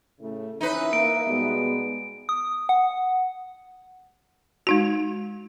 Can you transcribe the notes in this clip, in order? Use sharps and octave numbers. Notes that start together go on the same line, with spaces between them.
A2 C#3 A3
E3 C#4 D#4 B4 E5
A#3 D7
B2 G3 G#3 B3
D#6
F#5
G#3 D#4 F#4